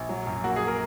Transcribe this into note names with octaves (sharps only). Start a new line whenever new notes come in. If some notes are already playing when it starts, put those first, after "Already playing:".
Already playing: A#1
F#3
F#2
A#3 F#4
G#4
A#3
A#4